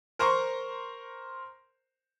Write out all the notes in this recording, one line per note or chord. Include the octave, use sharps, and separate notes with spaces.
A#4 C5 A#5 C6 C#6